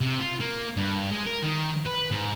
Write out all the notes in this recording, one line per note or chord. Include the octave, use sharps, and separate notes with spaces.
C3
F4
A#3
G2
G#3
A#4
D#3
B4
G#2